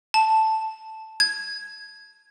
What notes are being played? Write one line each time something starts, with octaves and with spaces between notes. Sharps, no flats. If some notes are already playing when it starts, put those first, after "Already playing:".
A5
G#6